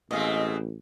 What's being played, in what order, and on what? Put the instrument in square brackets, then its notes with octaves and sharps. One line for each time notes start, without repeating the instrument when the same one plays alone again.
[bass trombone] A1 [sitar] B2 G#3 C4 [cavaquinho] D#5 F5